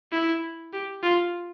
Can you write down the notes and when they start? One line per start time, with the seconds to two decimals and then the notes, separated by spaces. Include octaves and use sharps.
0.12 E4
0.73 G4
1.03 F4